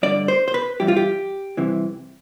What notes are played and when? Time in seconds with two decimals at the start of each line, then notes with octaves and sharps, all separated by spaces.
0.03 G2 D3 G3 D5
0.28 C5
0.48 C5
0.54 B4
0.80 G2 E3 G3 G4
0.88 F4
0.97 G4
1.57 C2 C3 E3